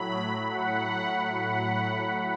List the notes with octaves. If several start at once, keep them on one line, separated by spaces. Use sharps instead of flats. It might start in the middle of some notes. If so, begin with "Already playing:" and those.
Already playing: A2 F#3 B5
F#5
F#5